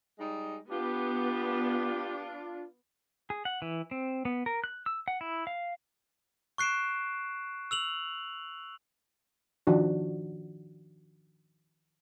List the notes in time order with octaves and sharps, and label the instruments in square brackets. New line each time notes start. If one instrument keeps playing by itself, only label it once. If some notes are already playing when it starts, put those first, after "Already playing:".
[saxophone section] G3 G#3 D#4
[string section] B3 [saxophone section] D4 F4 [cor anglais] G4
[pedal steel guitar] G#4
F#5
E3
C4
B3
A#4
F#6
E6
F#5
E4
F5
[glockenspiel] C#6 F#6 C7 D7 E7
E6 F7 F#7
[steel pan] D#3 F3 D4 F#4